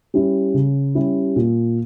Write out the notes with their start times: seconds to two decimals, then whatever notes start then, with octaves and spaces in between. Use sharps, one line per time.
0.14 G3 C#4 E4 G4
0.54 C#3
0.95 G3 C#4 E4 G4
1.36 A#2